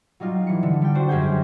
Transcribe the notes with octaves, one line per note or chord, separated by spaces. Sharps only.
F#3 G3 D#4 F4
E3 C#7
D3
G3 G5
D4 F#4 C5
F#2 G#3 G4 G#4 G#5 G6